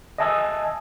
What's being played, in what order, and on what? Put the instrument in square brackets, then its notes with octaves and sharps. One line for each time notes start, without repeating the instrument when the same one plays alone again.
[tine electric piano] D#5 E5 G#5 A5 D#6 E6